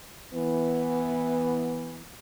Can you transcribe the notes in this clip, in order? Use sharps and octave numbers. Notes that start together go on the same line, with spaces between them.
E3 B3